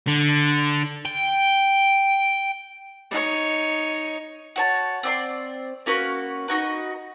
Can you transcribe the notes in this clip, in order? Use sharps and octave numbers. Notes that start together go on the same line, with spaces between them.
D3
G5
D#4 C#5
F#4 C#5 A5
C4 D5 C6
A#3 C#4 F#4 B4
D#4 F#4 B4